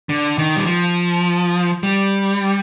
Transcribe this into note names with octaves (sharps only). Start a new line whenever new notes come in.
D3
D#3
G3
F3
G3